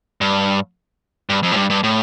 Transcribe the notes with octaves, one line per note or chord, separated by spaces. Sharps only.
G2
G2
F2
A2
G2
G2
A2